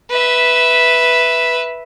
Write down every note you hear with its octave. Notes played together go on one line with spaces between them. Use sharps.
B4 E5